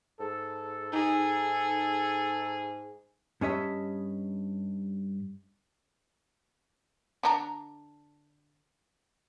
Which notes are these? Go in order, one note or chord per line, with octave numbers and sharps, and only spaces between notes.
G#2 A4
D#4 G#4
G2 C#4 D#5 E5
D3 D4 A#5